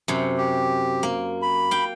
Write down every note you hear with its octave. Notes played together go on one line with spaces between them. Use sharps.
F#2 C3
G4
A#3
B5
F5 G5